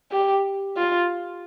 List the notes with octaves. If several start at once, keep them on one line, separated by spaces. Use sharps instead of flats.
G4
F4